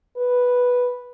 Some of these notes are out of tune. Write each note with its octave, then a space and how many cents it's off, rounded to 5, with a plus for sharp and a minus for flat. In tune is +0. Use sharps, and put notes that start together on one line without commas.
B4 -5